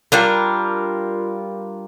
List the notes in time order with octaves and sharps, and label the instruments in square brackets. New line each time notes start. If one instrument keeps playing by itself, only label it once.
[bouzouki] G3 D4 F4 A#4